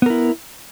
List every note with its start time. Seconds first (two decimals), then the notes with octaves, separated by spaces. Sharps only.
0.02 B3
0.06 A#4
0.10 E4